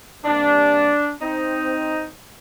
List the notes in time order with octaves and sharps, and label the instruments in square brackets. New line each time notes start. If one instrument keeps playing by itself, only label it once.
[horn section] C3 G3 A#3 D4
C4 D#4